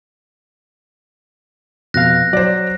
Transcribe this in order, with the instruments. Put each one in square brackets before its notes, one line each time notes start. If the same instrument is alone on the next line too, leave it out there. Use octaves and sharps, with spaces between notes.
[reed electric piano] F2 B2 F5 [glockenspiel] F#6 A#6
[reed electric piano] F#3 [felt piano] C5 D5